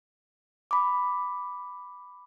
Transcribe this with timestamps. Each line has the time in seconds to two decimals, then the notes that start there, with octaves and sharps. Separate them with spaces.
0.71 B5 D6